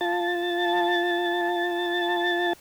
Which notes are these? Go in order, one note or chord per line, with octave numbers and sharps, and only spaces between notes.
F4 A5 A6